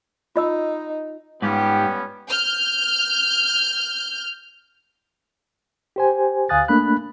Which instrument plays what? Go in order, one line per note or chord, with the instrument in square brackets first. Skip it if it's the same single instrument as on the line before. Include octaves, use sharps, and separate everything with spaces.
[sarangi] D#4 [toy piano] F4 D#5 E6
[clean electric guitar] G#2 [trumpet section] G3 B3 C#4 [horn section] F4 G4 [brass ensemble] G5
[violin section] F6 G6
[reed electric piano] G4 C5 G#5
D2 F5 G#5 D#6 F#6 A6
A3 A#3 D4 B5 F#6